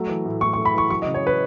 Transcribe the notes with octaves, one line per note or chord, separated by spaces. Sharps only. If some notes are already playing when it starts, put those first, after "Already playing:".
Already playing: F#3 A3
E3
A2
A2 C#6
C#6
A3
B5
E3 C#6
F#3 C#6
D#5
C#3
C#5
B4